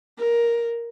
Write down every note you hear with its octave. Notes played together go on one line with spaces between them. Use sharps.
A#4